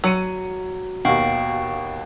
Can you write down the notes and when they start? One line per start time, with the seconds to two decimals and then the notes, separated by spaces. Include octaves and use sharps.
0.04 F#3 E6 C#7 D#7
1.05 D#2 B2 F#4 F5 G5